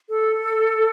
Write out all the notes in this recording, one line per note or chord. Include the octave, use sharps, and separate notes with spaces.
A4